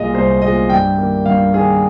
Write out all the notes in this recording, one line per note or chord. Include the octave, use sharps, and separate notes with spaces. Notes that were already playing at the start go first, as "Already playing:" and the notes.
Already playing: C2 A#2 G#3 D#5 F5
C2 C5
A#2 G#3 D#5
G2 G5
D#3 A#3
G2 F5
D#3 A#3 G#4